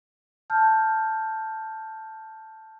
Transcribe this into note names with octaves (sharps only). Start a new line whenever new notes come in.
A5 F6 G6